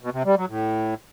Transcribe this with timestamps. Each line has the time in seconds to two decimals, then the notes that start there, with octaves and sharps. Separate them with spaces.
0.01 B2
0.13 C3
0.25 G3
0.37 F#3
0.49 A2